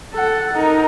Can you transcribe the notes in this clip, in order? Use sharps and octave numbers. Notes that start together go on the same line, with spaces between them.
A4 F#5
D#4 A#4